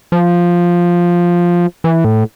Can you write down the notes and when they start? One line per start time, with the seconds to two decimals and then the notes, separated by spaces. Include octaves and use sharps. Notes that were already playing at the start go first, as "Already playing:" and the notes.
0.12 F3
1.84 E3
2.05 A2